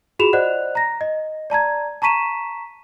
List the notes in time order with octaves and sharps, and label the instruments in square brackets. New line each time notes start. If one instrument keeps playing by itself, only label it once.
[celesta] F4 F#4 G#4 B5 E7 F7
C5 D5 D#5 F#5 F#6
A#5 A#6
D#5
D5 A5 A#5 G#6
A5 A#5 C#6 B6 D#7 E7